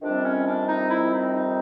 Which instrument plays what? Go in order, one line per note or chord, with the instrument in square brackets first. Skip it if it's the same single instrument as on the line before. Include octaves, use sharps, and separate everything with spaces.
[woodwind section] F2 C3 D#3 G3 C4 D4
C#4
D4
D#4
E4
D#4
D#4